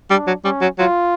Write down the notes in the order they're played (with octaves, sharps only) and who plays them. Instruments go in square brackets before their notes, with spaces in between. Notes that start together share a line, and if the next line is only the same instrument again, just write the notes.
[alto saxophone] G3 [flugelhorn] D4
[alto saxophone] F#3
[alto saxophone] G3 [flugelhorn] C#4
[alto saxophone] F#3
[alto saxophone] F#3 [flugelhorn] F4